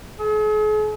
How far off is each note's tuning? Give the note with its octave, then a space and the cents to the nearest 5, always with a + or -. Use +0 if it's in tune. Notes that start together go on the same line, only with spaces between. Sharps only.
G#4 +45